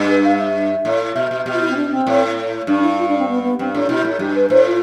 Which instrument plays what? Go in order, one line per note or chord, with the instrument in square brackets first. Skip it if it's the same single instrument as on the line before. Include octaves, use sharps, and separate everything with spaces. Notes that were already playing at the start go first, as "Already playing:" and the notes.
Already playing: [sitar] G2
[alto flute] B4
F5
E5
[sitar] A2
[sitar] B2 [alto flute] E5
[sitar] B2
[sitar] B2 [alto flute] G4
[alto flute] F4
E4
C4
D4
C4
[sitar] A2
[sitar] G2 [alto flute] D4
[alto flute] E4
F4
D4
C4
B3
B3
[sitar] G2 [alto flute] C4
[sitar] A2 [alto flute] D4
[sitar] B2 [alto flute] E4
[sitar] A2
[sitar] G2 [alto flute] G4
[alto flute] B4
[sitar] A2 [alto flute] C5
[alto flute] F4